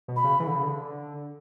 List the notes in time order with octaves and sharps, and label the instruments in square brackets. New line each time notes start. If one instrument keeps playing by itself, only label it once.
[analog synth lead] B2
[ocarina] B5
[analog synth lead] C#3
E3
D3
C#3
D3